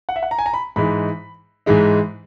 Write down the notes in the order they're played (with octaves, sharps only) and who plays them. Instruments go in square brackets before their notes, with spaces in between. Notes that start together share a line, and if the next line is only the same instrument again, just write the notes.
[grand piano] F#5
E5
F#5
A#5
G#5
A#5
B5
G#2 E3 G#3 D#4 B5
G#2 E3 G#3 D#4